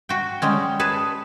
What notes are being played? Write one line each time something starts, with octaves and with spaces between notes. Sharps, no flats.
F#4 G5
G3 G#3 C#4
G#4 B4 A5